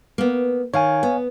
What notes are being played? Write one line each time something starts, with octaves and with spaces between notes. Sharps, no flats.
A#3 B3
D#3 C#5 F5 G#5
B3